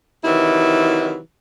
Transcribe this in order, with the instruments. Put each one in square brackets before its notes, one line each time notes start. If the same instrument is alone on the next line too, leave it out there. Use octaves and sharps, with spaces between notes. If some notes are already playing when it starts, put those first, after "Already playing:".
[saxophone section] C3 D#3 E3 F#3 E4